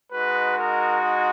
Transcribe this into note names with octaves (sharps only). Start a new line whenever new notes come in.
G#3 D#4 F#4 B4
A#4